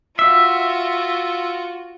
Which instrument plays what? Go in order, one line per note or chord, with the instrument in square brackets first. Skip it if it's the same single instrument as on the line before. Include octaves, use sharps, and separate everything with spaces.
[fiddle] F4 F#4 [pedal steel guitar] E5